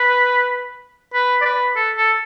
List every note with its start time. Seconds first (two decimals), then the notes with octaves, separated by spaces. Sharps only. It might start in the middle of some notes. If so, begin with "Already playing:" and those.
Already playing: B4
1.14 B4
1.41 D5
1.45 B4
1.76 A4
1.97 A4